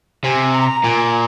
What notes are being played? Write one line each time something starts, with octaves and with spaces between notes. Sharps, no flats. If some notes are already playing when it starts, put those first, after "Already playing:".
C3 G#5
A#5
A#2 G#5